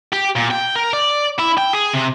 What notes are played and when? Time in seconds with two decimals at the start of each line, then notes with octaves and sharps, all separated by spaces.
0.13 G4
0.36 A#2
0.51 G5
0.76 A#4
0.93 D5
1.39 E4
1.58 G5
1.73 G#4
1.94 C3